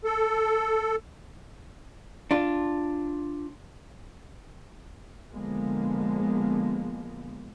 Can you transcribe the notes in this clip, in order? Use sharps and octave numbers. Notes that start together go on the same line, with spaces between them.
A4
D4 F4
A#2 D3 F3 G#3 A#3 B3